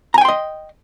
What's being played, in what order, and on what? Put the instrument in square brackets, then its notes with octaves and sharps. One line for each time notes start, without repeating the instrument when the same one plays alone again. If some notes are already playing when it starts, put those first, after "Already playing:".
[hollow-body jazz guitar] A#5
G#5
G5
C6
D#5